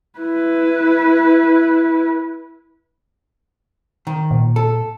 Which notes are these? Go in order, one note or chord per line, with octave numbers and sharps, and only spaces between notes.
E4 B4
D#3
A#2
A4